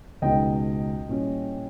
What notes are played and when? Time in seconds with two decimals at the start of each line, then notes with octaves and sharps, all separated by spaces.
0.22 C#2 B2 G#3 D#4 D#5 G5
1.09 A#2 G3 C#4 E4